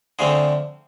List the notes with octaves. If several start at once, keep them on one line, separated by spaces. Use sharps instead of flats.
D3 F3 A3 C4 G#4